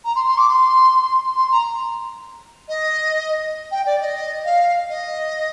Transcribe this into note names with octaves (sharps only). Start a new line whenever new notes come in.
A#5
C6
C6
D6
C6
C6
A#5
D#5
G5
D5
D#5
F5
D#5